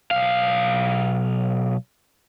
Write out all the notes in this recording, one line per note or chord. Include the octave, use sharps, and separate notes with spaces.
B1 F5